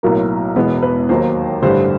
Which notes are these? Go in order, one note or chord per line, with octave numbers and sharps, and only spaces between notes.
B1 A2 F#3 A#3 A#4
E1 E2 B2 G#3 B3 B4
B4
D#2 D#3 F#3 A#3 C5
A1 G2 D3 G3 C5